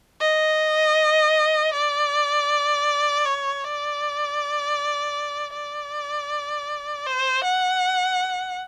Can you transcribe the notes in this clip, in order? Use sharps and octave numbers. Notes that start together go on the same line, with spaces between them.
D#5
D5
C#5
D5
D5
C5
F#5